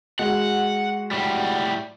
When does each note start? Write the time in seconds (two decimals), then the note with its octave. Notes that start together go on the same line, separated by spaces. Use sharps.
0.19 G#3 F#4 F#5
1.11 A2 G3